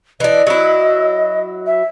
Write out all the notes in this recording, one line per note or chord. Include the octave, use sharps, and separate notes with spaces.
E3 D4 D#5
F#3 E4
E5